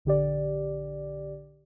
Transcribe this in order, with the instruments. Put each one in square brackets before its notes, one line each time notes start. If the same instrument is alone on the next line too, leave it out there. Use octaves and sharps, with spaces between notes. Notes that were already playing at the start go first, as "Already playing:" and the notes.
[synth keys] A#1 D3 G4 D5